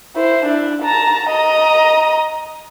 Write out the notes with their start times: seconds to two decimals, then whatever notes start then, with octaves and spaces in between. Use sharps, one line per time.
0.16 E4 C5
0.46 D4 E4
0.83 A5 A#5
1.30 D#5 A#5